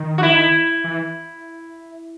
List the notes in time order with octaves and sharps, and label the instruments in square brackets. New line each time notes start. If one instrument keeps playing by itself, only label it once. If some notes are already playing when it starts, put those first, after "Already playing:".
Already playing: [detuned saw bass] D#3
[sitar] F#4
E4
[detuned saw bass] E3